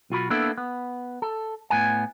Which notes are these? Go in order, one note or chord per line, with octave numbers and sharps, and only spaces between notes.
B1 F4 F#4 B5
A#3 B3 D4 E4 A4
B3
A4
A2 B3 G#5